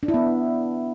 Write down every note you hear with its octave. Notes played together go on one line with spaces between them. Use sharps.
D4
E4
B3